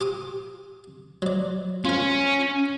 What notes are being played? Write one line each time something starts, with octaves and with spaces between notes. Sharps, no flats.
G4 D6 D#6
F#3 D5
C#4 F4 A#4